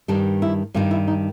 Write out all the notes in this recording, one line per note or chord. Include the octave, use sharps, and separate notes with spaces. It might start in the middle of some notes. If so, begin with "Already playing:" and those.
G2 D#3 G3 D4
E4
G2 D#3 G3 F4
E4
D#4